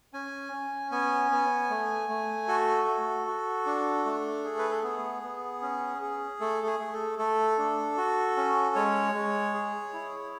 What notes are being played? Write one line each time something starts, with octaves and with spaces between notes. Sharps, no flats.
C#4 G#5
C#4
B3 G#5
B3
A3
A3
F#4 A4
F#4
F#4
D4
A3
G#4
B4
A4
B3 G#4
B3
C#4
G#4
A3 A4
G#4
A3
A4
A3 A4
D4
F#4
C#4
G#3 C#5
G#3
G#4
E4